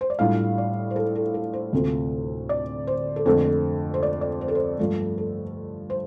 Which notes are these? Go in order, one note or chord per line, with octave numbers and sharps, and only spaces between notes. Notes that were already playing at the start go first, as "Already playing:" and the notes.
C5
D5
A2 G3 D4 F4 F5
D5
C5
A4
A4
A4
C5
D2 C3 A3 C4 F4
D5
C5
A4
F2 D3 A3 C5
C5
D5
D5
C5
A4
C5
G2 F3 A3
A4
C5